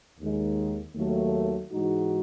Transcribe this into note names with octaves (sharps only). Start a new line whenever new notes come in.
D#2 D#3 G#3
D#2 D#3 F#3 A3
G#2 E3 G#3 D#4 F#4